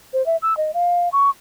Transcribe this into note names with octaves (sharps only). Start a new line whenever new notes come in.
C5
E5
E6
D#5
F5
C#6